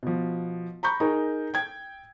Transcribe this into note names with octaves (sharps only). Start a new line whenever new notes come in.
B2 F3
A#5 B5 C#6 G6
D#4 G#4 A#4
G5 G#6